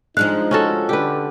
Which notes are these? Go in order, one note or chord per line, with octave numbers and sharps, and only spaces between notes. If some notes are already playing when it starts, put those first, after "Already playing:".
F3 G#3 D4 D#4 F5 F#6
C#4 F#4 A4
D3 G4 B4